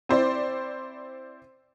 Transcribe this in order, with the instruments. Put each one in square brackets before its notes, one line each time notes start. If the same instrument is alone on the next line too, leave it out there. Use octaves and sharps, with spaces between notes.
[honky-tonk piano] C4 E4 C5 D5